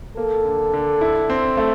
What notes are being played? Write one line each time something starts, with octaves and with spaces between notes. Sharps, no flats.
A#3 A4
D3
D3
E4
C4
A3